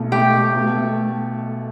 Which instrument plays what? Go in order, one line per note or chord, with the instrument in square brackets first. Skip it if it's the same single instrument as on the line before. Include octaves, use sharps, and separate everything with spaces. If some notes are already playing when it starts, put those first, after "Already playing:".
Already playing: [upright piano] B1 A3
[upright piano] A3 [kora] G4
[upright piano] A3
B2
A3